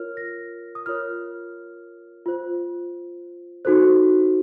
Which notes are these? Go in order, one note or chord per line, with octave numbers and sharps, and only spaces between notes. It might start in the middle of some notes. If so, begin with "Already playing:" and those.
Already playing: F4 A#4 C#5 F6
A#6
D#6
F4 A#4 C#5 F6
F4 C5
D#4 F#4 A4 C5